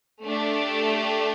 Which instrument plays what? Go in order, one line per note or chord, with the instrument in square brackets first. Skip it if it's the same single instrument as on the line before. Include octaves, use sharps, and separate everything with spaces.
[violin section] A3 D4 G4